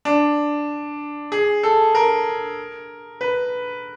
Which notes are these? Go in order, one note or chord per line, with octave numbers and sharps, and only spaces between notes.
D4
G#4
A4
A#4
B4